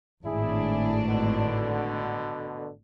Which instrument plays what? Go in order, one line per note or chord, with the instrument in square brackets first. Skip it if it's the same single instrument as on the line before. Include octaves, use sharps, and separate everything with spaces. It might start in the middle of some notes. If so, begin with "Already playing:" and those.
[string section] G#1 A2 D4 [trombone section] E4 G#4
[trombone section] B2 D3